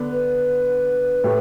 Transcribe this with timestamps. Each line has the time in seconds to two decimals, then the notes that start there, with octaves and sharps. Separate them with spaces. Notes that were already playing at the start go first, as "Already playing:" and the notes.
Already playing: D3 B3 D4
0.11 B4
1.24 A2 A3 G4